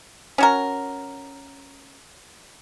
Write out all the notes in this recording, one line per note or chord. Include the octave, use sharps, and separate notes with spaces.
C#4 F#4 A#4